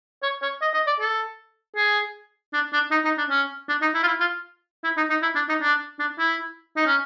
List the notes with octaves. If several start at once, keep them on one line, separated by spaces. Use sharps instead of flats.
C#5
C#5
D#5
D#5
D5
A4
G#4
D4
D4
D#4
D#4
D4
C#4
D4
D#4
E4
F4
E4
F4
E4
D#4
D#4
E4
D4
D#4
D4
D4
E4
D#4
C#4